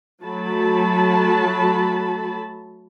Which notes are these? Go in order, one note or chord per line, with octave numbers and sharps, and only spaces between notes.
F#3 A3 A5 B5